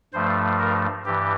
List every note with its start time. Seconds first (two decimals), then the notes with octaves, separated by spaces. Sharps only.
0.13 G2 F3 A3 C5
0.59 A#4
1.06 G2 E3 G4